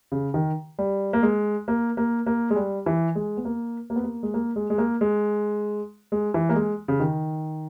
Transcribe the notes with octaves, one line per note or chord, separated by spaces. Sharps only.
C#3
D#3
G3
A#3
G#3
A#3
A#3
A#3
G#3
G3
E3
G#3
B3
A#3
A#3
B3
A#3
G#3
A#3
G#3
G#3
A#3
G#3
G#3
E3
A#3
G#3
C#3
D#3